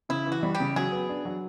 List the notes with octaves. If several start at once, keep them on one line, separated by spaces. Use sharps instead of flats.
C#3 E4
E3
F#4
G3
G4
C#3
F#3 G#4
B3
D4
F#3